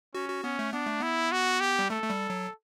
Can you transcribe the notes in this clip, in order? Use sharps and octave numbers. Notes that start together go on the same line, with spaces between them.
C#4 F#4
F#4
B3 C#4
A3
B3 D4
A3
B3 E4
F#4
G4
G3
A3 A4
A3
G3
F#3